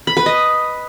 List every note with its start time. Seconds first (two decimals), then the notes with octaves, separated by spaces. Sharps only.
0.07 B5
0.17 B4
0.26 D#5